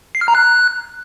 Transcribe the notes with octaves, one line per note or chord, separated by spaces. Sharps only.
C7
F6
A#5
F#6